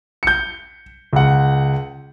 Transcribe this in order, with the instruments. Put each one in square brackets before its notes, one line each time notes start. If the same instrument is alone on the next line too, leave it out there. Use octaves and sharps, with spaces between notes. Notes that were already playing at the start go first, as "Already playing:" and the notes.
[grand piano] G6 C#7
C#2 F#5